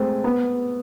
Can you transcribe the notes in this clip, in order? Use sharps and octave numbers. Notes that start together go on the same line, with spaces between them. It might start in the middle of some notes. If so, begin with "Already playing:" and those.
Already playing: G#3 A3 C4
B3